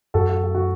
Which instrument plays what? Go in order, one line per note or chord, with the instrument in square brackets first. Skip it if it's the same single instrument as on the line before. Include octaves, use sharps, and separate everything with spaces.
[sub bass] F#2 [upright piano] F#4 A4
[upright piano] F#4
F#4
F#4